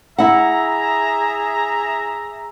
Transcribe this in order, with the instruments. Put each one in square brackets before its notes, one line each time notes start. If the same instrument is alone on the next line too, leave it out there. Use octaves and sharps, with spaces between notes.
[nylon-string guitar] E4 F#5 [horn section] G#4 E5 A#5